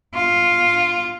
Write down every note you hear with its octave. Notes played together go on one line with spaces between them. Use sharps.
F4